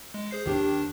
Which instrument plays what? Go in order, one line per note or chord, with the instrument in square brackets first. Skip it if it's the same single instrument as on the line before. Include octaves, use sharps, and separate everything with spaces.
[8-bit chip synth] G#3
G#4 C5 C7
[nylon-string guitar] D#2 G4 [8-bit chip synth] D#3 D4